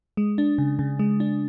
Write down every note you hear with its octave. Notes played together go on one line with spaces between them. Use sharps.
G#3
D4
C#3
C#3
G#3
D4